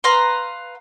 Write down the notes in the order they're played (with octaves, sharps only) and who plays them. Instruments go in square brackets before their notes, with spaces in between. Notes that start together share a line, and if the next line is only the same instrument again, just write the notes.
[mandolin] B4 F5 A#5 C6